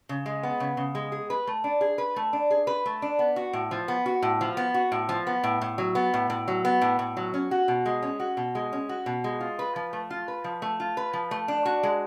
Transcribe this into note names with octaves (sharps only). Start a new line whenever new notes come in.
C#3
G#3
B3
C#3
C#3
G#3
G#4
B4
A3
D4
G#4
B4
A3
D4
G#4
B4
A3
D4
B3
F#4
A2
F3
B3
F#4
A2
F3
B3
F#4
A2
F3
B3
A2
A2
F#3
B3
A2
A2
F#3
B3
A2
A2
F#3
C#4
F#4
B2
G#3
C#4
F#4
B2
G#3
C#4
F#4
B2
G#3
F4
B4
F3
A3
F4
B4
F3
A3
F4
B4
F3
A3
D4
F#4
G#3